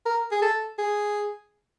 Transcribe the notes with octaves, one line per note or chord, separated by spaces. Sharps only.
A#4
G#4
A4
G#4